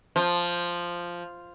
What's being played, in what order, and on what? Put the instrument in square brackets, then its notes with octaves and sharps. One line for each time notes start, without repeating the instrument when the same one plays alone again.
[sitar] F3